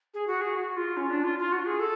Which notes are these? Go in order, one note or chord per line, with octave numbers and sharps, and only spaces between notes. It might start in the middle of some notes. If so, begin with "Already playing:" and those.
G#4
F#4
G#4
F#4
F4
C#4
D4
F4
F4
F#4
G#4
A4